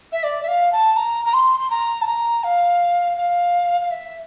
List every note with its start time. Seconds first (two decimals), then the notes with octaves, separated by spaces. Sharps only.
0.12 E5
0.24 D5
0.43 E5
0.48 F5
0.73 A5
0.96 A#5
1.25 A#5
1.34 C6
1.60 C6
1.70 A#5
2.02 A5
2.07 A#5
2.44 F5
3.17 F5
3.81 F5
3.91 E5